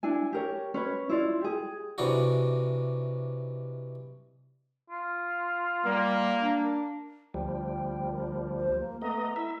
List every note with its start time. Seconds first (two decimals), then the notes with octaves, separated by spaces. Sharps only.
0.03 D4 E4 G#5
0.33 G4 A#4 C#5
0.74 C#4 B4 C#5
1.09 E4 F4 D5
1.41 G4 G#4
1.98 C3 E3 D4 D#4 F#4
4.90 F4
5.85 G3 A#3
6.41 D4
7.34 D2 F3 G3 G5
8.12 A#4
8.56 C5
8.79 A#3
9.02 A3 B3 D#5 A#5
9.36 E4 E5